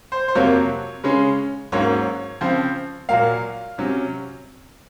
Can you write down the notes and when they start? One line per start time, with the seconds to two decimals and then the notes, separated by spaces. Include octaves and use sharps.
0.12 C5
0.28 C5
0.35 F2 C3 F#3 A#3 C#5
1.04 C#3 G#3 C#4
1.72 G#2 F#3 A#3 C#4 C#5
2.41 C#3 F3 C4
3.09 A#2 F#3 A#3 F5
3.78 C3 F#3 C#4